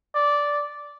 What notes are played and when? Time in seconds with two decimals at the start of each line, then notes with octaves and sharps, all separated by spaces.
0.15 D5